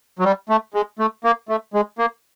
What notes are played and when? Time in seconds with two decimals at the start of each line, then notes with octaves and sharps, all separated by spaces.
0.19 F#3
0.25 G3
0.49 A3
0.74 G#3
0.99 A3
1.24 A#3
1.49 A3
1.74 G#3
1.99 A#3